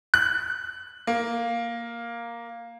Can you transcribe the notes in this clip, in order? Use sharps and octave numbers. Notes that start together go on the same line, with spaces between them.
F#6
A#3